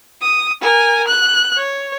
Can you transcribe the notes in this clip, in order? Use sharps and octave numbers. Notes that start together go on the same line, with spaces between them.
D#6
A#4 G#5
F#6
C#5